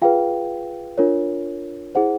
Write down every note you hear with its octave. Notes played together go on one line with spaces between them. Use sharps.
F4 G#4 B4 F5 G5
D4 F4 A#4 C#5
E4 G#4 C5 F#5